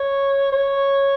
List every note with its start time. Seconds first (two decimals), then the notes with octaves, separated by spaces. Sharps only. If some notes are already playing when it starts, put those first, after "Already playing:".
Already playing: C#5
0.52 C#5